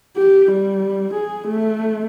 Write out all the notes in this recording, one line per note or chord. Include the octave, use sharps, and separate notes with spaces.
G4
G3
G#4
A3